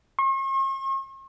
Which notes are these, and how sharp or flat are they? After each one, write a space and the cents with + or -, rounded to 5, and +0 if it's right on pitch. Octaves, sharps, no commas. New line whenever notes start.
C#6 -45